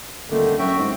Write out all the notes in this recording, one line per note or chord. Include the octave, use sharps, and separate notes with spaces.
D#1 D3 D#3 A3
F#2 F#4 E5 G5
G#2 C4